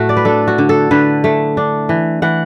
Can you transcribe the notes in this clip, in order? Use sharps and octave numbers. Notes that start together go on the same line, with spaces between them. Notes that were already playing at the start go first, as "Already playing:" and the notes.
Already playing: A2 A3 F#4
D5
B4
D4 A4
F#4
D3
A4
D3 B4
A3
D4
E3
E3 F#5